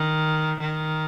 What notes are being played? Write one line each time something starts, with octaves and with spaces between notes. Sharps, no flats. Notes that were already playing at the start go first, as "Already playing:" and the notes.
Already playing: D#3
D#3